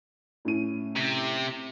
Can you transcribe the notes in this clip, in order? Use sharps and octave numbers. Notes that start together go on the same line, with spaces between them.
A2 C#4 D#7
C3